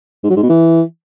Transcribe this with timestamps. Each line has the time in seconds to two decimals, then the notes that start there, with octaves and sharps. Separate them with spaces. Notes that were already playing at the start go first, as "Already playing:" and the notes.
0.24 G#2
0.30 F#3
0.36 G#2
0.43 B2
0.49 E3